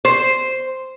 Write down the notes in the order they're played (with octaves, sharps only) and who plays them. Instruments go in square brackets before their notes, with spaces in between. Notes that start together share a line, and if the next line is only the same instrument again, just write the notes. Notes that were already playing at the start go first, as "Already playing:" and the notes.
[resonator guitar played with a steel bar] C5